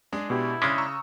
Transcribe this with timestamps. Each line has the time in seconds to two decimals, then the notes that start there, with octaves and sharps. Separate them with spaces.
0.13 G#3 D4 G#4
0.30 B2 E4 G4
0.62 C#3 G#3 C#4 D4 C6 D6 D#6
0.78 A#5 C#6 E6